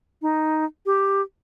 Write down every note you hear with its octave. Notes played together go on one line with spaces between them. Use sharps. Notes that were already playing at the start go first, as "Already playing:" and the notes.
D#4
G4